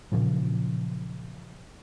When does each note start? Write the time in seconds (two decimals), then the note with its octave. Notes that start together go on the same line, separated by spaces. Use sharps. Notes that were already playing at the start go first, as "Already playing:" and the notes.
0.12 A#2 C#3 F3 F#3